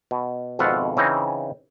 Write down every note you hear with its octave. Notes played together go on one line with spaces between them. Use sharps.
B2
G#1 F2 B2 F4 E5 F#5
C#3 E3 C4 D#4